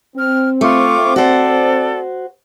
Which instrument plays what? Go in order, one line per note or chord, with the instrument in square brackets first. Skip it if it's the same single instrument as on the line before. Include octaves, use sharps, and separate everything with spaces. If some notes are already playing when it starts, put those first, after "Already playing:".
[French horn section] C4 [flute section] F6
[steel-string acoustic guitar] A3 [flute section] F4 C#6 D6
[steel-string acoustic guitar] F#4 C5 [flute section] A4 D5